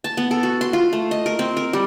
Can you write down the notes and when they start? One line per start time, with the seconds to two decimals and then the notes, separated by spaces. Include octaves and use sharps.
0.04 A5
0.17 B3
0.31 A4
0.43 F#4
0.61 C6
0.73 F4
0.93 A3
1.11 D#5
1.26 A#4
1.39 C4
1.57 A#4
1.73 G3